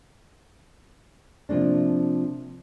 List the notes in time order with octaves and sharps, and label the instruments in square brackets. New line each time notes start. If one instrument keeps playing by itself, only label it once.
[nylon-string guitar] C3 F3 A#3 D4